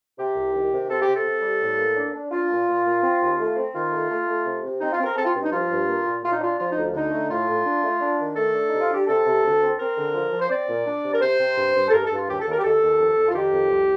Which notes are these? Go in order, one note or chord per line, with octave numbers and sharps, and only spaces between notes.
C3 G4
C2
D#3
C3
C4 A4
G4
C3
A4
C3
G3
A2
A#3
D4
D4
D4 F4
A#2
A#2
A#2
C4
D#2
A3
C4
D#3 F4
A3
A3
A3
C3
C3
C4 D#4
F4
C4
A#4
C4 A4
F4
G2
D#4
F3 F4
G2
A#3
A#2
A#2 F4
D#4
D4 F4
F3 F4
D#4
D2
D3 D#4
A3
A2 F4
A2
D4
A3
D4
D#3
A3 A4
D4
C3 D#4
F4
D4 G4
C3 A4
C3
D2
C4
C4 A#4
D3
F3
F3
C5
C4 D5
A#2
D4
C3
A#4
C3 C5
C3
G2
G2
A4
G2 A#4
A4
G2
F4
D#2 G4
A4
D#2
A#4
G4
D#2 A4
D#2
F2
F2
F4
D#3 G4
F2
C2